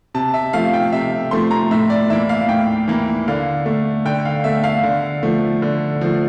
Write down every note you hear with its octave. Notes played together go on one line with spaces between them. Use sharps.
C3 A5
E5
F3 A3 F5
G5
C3 E5
F3 A3 C6
A#5
A2 E5
D5
E3 A#3 E5
F5
A2 G5
E3 A#3
D3 F5
A3
D3 G5
F5
A3 E5
F5
D3
F3 A3
D3
F3 A3